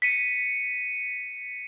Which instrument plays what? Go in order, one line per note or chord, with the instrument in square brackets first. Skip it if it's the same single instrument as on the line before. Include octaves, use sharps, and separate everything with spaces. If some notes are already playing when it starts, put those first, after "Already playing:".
[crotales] B6 C#7 D#7